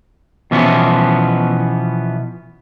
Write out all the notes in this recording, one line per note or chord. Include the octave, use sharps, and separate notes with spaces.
B2 E3 F3 B3 C#4